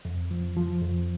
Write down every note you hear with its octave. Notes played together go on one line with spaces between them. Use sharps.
F2
F3
F3
F2